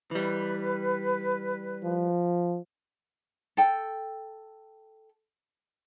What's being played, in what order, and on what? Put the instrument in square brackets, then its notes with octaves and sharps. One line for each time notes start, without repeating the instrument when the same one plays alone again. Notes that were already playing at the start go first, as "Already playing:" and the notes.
[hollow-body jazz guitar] E3 G3 [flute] B4
[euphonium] F3
[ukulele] A4 G5